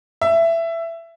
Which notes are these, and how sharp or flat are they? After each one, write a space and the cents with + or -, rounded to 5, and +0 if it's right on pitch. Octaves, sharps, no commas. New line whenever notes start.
E5 +15